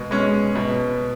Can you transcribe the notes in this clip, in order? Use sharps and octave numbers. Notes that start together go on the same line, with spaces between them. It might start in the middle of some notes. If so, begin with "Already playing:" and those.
Already playing: B2 G#3
G#3 C#4
B2